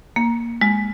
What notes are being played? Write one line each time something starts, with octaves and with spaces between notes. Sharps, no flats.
A#3
G#3